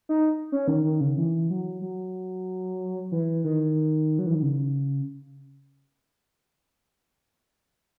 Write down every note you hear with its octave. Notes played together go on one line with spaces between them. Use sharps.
D#4
C#4
D#3
D#3
C#3
E3
F#3
F#3
E3
D#3
F#3
E3
D#3
C#3